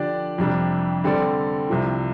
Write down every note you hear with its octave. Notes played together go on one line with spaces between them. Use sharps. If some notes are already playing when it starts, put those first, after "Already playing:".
Already playing: D3 F3 D4 G4 D5
F2 C3 G3 D4
D3 G3 C4 A4 D5
C2 C3 F3